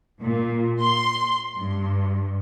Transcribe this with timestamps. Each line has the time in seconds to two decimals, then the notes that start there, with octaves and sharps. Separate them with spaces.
0.23 A#2
0.81 C6
1.58 G2